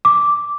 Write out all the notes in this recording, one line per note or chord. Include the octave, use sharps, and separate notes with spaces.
D6